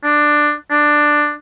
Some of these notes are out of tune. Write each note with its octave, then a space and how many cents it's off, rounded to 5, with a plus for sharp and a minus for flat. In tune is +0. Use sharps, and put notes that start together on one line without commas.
D4 +10
D4 +10